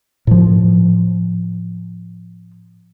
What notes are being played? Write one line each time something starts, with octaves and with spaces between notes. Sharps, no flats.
A2 F3